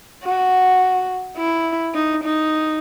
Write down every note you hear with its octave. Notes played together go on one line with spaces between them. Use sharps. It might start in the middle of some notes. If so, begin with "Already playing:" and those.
F#4
E4
D#4
D#4